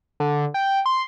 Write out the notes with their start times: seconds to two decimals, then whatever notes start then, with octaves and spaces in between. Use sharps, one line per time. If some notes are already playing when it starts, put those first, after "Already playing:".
0.20 D3
0.54 G5
0.86 C6